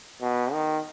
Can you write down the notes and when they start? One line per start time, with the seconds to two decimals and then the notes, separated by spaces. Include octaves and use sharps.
0.21 B2
0.53 D#3